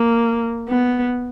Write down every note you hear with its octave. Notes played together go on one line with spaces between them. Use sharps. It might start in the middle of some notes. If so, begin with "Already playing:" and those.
Already playing: A#3
B3